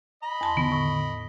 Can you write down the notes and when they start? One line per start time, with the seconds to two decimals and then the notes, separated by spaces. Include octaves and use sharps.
0.23 D#5 B5
0.41 E2 A5 C6
0.57 D3 D#3 B3
0.72 A2